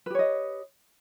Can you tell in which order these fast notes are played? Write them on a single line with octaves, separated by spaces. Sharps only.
B4 G4 C#5 D#5